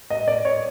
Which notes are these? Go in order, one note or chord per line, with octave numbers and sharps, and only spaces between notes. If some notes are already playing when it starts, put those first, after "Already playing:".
D#5
D5
C#5